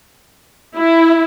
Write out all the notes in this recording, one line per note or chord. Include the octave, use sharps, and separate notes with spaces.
E4